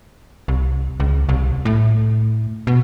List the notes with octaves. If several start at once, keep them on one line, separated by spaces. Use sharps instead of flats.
C2
C#2
C2
A2
B2